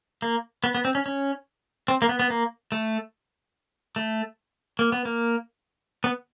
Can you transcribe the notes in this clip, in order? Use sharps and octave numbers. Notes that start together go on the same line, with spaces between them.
A#3
B3
B3
C4
C#4
C#4
C4
A#3
B3
B3
A#3
A3
A3
A#3
B3
A#3
B3